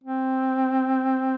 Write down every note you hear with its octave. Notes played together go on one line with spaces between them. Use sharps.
C4